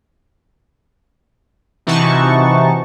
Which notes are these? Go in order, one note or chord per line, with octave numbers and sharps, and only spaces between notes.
C3 E3 D#4 F#4 A5 C#6